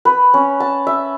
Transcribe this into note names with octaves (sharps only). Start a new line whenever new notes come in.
B4
C#4
A5
E5